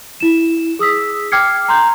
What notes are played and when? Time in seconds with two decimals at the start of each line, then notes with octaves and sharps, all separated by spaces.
0.20 E4 E7
0.79 G#4 D#6 E6 B6
1.32 G5 D6 F6 G#6 C7 C#7
1.68 A#5 C6 G6